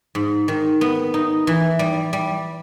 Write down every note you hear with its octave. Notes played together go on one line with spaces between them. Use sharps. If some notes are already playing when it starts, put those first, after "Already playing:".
G#2
D#3
B3
D#4
E3
G3
G3